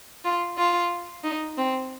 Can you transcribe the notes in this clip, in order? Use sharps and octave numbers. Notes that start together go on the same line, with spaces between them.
F4
F4
D#4
C4